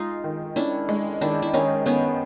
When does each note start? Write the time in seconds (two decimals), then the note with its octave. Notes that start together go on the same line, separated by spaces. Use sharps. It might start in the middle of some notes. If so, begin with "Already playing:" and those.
Already playing: G#3 D#4 F4
0.24 D#3
0.56 C#4 D4 E4
0.89 G#3
1.21 D#3 D4 E4
1.42 E4
1.54 D#3 C#4 D#4
1.86 D#3 B3 C#4